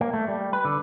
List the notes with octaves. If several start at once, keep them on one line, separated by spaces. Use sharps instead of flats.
A#3
A3
G3
B4
D3